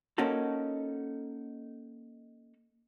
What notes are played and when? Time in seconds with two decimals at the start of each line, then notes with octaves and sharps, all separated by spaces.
0.18 A#3 C#4 D#4 F#4 A4